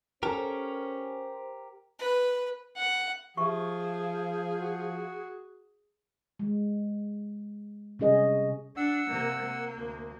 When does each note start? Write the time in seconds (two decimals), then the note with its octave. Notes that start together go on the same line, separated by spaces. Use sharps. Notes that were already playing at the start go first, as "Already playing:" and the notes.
0.23 C#4 G4 A4 A#4 C5
1.99 B4
2.77 F#5
3.37 F3 G4 G#4 E5 C#6
4.60 F#4
6.39 G#3
7.99 C3 G3 C#4 G#4 D#5
8.77 D4 F#5 E6
9.10 C3 A#3
9.43 A#3
9.76 D2